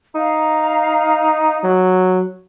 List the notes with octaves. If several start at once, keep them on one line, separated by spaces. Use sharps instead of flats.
D#4 F5 A#5
F#3